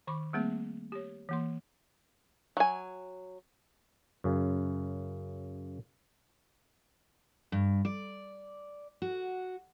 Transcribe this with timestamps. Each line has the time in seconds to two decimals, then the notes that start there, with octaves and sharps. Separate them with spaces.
0.07 D#3 B5 C#6 D6
0.33 G3 A3 A#3 C4 G#4 E5
0.92 G4 C#5
1.29 E3 A#3 C6
2.57 F#3 G#5
4.24 F#2 C#3
7.52 G2
7.85 D5
9.02 F#4